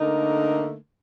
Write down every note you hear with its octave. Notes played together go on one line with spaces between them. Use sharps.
D3 A3 A#3 D#4 A#4